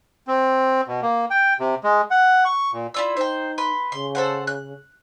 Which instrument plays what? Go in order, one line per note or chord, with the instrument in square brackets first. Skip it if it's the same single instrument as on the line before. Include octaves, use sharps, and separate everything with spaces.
[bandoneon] C4
B2
A#3
G5
C3
G#3
F#5
C#6
A#2
[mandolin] E4 F4 E6 [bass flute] D5
[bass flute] D#4 [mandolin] C5 G5
[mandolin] B4 C6
[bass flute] C#3 [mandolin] C6
[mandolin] A4 C5 F#5
F#6